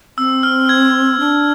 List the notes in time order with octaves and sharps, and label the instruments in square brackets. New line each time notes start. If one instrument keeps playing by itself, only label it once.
[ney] C4 [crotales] E6
[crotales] F6
G#6
[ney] D4